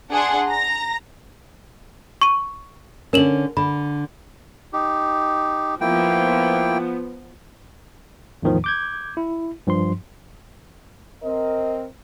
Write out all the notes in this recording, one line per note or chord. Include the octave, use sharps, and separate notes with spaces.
D4 G#4 F#5 C6
A#5 A#6
C#6 D#7
D3 C#4 A#4 E7 F#7
D3 B5
D#4 G4
F3 A#3 B3 E4 G5
E2 A2 D#3 F3
D6 G6 G#6
E4
G2 F3 C6
C4 A#4 D#5